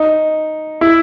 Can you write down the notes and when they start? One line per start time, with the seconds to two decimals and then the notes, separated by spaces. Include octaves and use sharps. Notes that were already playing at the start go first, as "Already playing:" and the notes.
Already playing: D#4
0.81 E4